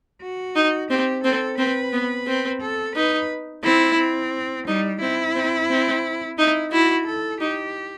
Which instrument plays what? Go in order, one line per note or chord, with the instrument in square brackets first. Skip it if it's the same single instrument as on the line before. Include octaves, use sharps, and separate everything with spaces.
[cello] F#4
[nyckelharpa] D#4
[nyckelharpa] C4 [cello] G4
[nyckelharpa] C4 [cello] A4
[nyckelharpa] C4 [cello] B4
[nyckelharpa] B3
C4
[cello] A4
[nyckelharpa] D#4 [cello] B4
[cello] C4 [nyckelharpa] E4
[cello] C4
[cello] G3 [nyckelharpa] D#4
[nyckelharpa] C4 [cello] E4
[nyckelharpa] C4
C4
[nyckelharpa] D#4 [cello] E4
[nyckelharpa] E4 [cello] F#4
[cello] A4
[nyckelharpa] D#4 [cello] G4